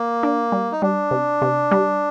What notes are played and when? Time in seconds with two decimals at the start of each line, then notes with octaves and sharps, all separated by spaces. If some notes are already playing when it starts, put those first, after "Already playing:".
Already playing: A#3
0.23 D4
0.52 G3
0.72 D#4
0.82 G3 D4
1.11 C3
1.42 C3
1.71 G3